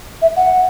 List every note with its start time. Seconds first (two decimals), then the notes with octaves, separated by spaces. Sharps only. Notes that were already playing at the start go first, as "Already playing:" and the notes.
0.22 E5
0.37 F#5